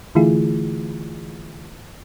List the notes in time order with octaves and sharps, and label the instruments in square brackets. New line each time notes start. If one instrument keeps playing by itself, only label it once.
[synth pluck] D3 E3 A3 E4 F4 G#4